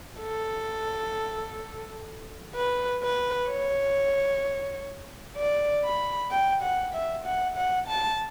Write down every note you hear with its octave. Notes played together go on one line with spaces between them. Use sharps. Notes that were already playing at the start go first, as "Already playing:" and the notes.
A4
B4
B4
C#5
D5
B5
G5
F#5
E5
F#5
F#5
A5